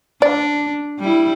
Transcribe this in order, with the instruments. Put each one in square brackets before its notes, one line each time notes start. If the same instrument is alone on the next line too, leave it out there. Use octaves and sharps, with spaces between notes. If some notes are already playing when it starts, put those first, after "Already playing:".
[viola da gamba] D4 [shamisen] D5
[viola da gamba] G3 E4